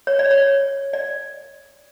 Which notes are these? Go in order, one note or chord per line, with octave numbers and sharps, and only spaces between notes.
C#5
D5
C#5
D5